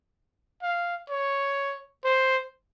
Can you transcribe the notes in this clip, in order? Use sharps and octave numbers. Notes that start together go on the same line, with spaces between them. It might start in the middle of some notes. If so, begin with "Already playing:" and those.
F5
C#5
C5